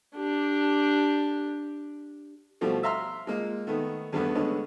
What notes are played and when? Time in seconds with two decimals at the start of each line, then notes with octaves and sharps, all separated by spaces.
0.16 D4 G4
2.61 B2 F3 G3 A3
2.83 E5 F5 A#5 C6 E6 F6
3.27 G#3 A#3 F4
3.67 D#3 A3 B3
4.12 E2 G2 G3 A3 B3
4.35 D3 G#3 A3 B3 C#4